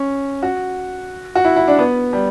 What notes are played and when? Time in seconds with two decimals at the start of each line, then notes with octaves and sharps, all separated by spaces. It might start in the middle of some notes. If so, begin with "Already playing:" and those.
Already playing: C#4
0.43 F#4
1.35 F#4
1.45 E4
1.56 E4
1.67 D4
1.79 B3
2.13 G3